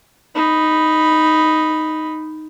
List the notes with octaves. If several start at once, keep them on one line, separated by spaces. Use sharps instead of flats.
D#4 B5